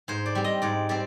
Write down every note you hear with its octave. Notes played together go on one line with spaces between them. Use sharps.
G#2 C5
D5
G3 C4
D#5
G#2 D5
G3 C4 D5